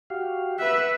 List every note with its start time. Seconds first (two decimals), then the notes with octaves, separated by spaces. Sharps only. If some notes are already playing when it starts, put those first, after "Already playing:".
0.10 F#4 G4 F5
0.59 B4 E5 F#5